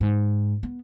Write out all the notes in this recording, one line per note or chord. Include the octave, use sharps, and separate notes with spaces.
G#2
B3